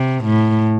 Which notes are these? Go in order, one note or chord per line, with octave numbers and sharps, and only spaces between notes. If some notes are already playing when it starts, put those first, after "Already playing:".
Already playing: C3
A2